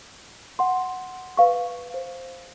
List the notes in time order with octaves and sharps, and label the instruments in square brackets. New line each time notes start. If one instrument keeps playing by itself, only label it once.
[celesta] F#5 C6
B4 F5 C#6
C5